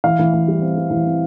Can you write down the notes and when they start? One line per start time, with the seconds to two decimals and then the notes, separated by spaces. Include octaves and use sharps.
0.04 E3 F5
0.19 E3
0.34 E3
0.48 G3
0.62 C4
0.76 G3
0.91 E3
1.06 C4